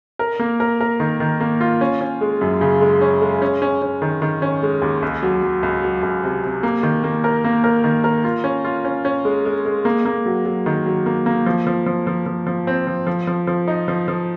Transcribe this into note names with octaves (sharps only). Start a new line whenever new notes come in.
A#4
A#3
A#4
A#4
D#3
D#3
A#3
F4
C#4
C#4
G#3
F#2
C#3
G#3
C#4
G#3
C#4
C#4
C#4
D#3
D#3
C#4
G#3
D#2
C#2
F#3
F#3
C#2
F#3
C#2
C3
C3
A#3
D#3
A#3
A#4
A#3
A#4
D#3
A#4
F4
C#4
F4
C#4
C#4
G#3
G#3
G#3
A#3
A#3
F#3
F#3
D#3
F#3
A#3
A#3
F3
F3
F3
F3
F3
F3
C4
F3
F3
F3
F3
D#4
F3
F3